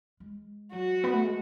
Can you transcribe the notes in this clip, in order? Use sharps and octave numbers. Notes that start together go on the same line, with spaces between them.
G#3
F#3 F#4
B3
A3
G#3